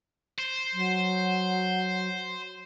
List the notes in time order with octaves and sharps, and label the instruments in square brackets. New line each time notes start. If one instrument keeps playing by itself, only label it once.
[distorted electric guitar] C5
[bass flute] F#3